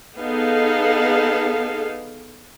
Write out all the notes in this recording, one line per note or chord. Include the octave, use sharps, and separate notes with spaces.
B3 D#4 G#4 A4 F5